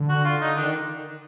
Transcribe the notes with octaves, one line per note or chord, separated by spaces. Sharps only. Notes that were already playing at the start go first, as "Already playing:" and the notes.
Already playing: D3
F#4
F4
D#4
D#3 D4